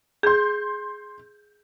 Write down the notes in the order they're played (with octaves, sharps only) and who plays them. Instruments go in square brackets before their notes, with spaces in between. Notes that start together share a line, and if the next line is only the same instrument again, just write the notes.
[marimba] G#4 [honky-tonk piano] C6 G6